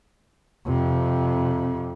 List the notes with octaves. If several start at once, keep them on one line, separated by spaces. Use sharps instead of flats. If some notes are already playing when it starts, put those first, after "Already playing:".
F2 C3